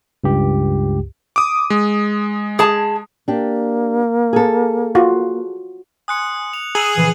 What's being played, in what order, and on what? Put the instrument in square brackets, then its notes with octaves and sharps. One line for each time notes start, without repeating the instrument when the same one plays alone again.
[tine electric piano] C#2 G2 G4
[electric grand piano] D6 D#6
G#3
[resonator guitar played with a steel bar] G#4 A5
[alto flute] A#3 [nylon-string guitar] D4 G4
[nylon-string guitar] G#4 A4
[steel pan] F4 F#4
[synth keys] G#5 C6 [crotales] D#6 F#6 C#7
[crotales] F7
[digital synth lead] G#4 [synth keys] A#5 E6 E7 [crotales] F#7
[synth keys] A#2 C#3 F3 [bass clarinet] E3